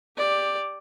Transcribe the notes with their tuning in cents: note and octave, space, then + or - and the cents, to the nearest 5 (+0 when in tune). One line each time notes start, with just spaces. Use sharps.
G4 +10 D5 +5